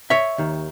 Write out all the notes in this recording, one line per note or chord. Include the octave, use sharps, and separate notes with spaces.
C#5 E5
D#2 D#3